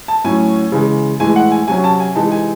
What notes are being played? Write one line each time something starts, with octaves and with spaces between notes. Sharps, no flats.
A5
A2 F#3 C#4 G#5
C#3 E3 G#3
A2 E3 G#3 G#5
F#5
G#5
C3 F#3 C#4 G#5
A5
G#5
C3 E3 G#3 D#4 A5
G#5